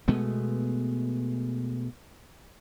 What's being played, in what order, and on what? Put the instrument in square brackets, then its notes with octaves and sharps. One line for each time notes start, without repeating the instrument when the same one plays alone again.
[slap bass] B2 G#3 A3 B3